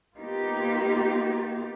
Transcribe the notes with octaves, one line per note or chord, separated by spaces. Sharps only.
A#3 B3 D#4 F4 G4